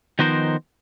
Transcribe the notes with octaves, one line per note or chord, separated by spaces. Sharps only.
D#3 F3 B3 D#4 A#4 C5